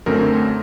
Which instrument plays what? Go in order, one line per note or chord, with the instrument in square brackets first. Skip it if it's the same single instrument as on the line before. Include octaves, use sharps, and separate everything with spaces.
[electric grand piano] F#2 D3 A3 C4 A#4